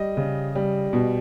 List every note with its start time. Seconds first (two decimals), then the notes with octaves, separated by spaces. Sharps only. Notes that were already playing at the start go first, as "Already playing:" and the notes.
Already playing: G3 D#5
0.17 C#3
0.55 G3
0.93 B2